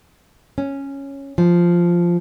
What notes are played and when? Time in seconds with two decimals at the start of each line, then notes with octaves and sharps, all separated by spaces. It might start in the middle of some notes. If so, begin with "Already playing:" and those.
0.58 C#4
1.38 F3